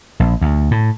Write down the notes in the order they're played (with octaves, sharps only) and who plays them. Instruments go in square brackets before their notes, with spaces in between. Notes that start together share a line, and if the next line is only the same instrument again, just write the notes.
[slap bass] A#1
D2
A2